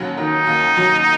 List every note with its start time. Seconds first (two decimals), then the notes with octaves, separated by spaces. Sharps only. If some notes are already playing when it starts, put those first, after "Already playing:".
Already playing: D#2 F#3 C#4
0.18 D#3 D#4
0.47 D#2
0.77 F#3